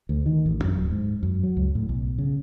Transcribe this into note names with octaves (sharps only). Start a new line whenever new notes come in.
D2
D#3
A1
F#2
D1
G#2
F#2
F#3
C#2
A2
B1
C#3